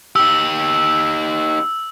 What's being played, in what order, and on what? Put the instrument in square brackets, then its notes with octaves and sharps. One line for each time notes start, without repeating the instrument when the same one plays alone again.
[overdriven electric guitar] D#4 G4 [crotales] E6